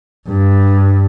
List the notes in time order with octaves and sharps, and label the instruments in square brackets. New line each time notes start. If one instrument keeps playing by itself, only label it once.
[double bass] G2